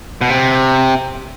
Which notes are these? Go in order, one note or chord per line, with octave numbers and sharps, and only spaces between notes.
B2
C3